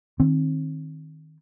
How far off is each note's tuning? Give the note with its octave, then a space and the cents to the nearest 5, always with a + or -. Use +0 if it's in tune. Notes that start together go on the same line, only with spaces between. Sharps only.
D#3 +0 C4 +25